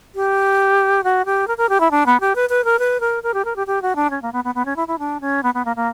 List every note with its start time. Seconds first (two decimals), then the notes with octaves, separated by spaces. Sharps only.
0.15 G4
1.04 F#4
1.25 G4
1.48 A#4
1.58 A#4
1.69 G4
1.80 E4
1.91 D4
2.06 B3
2.20 G4
2.35 B4
2.50 B4
2.65 A#4
2.79 B4
3.00 A#4
3.23 A#4
3.34 G4
3.45 A#4
3.56 G4
3.67 G4
3.82 F#4
3.96 D4
4.10 C#4
4.22 A#3
4.33 B3
4.44 B3
4.55 B3
4.65 C#4
4.76 E4
4.88 E4
4.99 D4
5.21 C#4
5.43 B3
5.54 B3
5.65 A#3
5.76 A#3